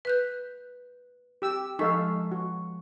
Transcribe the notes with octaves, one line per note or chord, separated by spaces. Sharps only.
B4 F#6 G6
G4 E6
F3 G#3 D#4 A4 F5 C#6
F#4